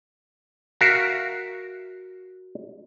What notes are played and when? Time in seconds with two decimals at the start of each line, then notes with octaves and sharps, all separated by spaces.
0.81 F#4 A#4 E5 F5